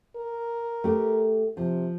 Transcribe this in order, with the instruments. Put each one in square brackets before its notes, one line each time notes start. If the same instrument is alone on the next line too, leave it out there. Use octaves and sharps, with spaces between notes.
[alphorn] A#4
[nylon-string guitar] A3 G4
[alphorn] C3 [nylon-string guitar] F3